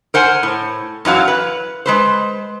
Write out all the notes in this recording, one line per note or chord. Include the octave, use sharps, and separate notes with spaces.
A#4 C5 F#5 G#5
A2
F#2 E3 F#3 F5
B4
G#3 B4 C5